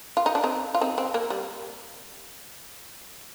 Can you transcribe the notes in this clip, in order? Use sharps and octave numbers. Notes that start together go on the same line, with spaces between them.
F4
D#4
D4
C4 D#4
F4
C4 D#4
C4
A#3
G3